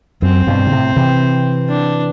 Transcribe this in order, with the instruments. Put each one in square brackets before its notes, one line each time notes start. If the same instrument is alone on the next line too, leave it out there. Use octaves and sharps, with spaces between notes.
[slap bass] F#2 [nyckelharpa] C4
[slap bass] G2 B2
B2
A2 C3
C3 E3
[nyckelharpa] D4